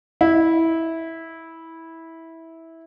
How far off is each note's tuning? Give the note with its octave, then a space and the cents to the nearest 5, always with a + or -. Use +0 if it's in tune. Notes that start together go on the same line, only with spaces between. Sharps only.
E4 -15